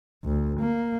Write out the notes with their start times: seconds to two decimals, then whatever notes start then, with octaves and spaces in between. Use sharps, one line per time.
0.25 D2
0.60 A#3